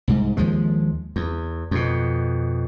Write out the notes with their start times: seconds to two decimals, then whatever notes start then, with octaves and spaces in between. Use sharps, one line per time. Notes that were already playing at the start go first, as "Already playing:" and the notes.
0.08 C2 G#2
0.37 D#2 F3 G#3
1.16 E2
1.71 F2 B2